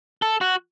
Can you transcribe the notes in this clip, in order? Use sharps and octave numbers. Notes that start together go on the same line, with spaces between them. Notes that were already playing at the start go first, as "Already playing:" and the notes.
A4
F#4